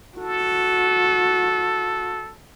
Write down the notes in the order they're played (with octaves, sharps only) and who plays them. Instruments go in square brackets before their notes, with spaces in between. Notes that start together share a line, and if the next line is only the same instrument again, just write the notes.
[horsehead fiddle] F#4 [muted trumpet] A4